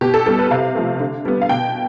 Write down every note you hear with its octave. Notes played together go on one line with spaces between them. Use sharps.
B2 G4
A4
G3 B3 A4
B4
C3 F5
F3 A3
D3
G3 B3
F5
B2 G5